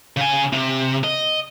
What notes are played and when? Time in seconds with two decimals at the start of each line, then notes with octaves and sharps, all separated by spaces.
0.17 C#3 G#5
0.52 C3
1.04 D#5